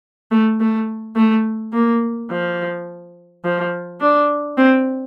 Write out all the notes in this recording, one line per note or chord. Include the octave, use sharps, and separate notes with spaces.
A3
A3
A3
A#3
F3
F3
D4
C4